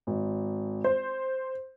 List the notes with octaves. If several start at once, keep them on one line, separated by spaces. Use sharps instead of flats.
G#1
C5